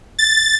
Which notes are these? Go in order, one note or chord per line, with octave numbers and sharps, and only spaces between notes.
A6